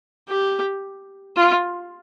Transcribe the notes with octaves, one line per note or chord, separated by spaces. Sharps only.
G4
F4